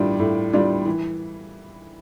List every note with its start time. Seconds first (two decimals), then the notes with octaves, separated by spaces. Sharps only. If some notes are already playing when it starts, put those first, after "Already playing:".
Already playing: A2 G3 D4 F4
0.19 A2
0.53 G3 D4 F4
0.86 E3